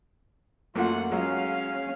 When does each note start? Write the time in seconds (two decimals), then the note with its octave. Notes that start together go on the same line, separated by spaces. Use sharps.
0.75 F#2 A3 A#3 F4 F#5
1.12 F#3 G#3 C#4 F5